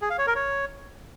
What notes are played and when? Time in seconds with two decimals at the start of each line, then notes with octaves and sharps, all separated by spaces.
0.02 G#4
0.10 F5
0.18 C#5
0.27 A#4
0.35 C#5